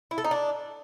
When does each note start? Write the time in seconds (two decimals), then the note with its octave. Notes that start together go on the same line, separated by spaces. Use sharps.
0.11 E4
0.18 A4
0.24 D#4
0.31 D4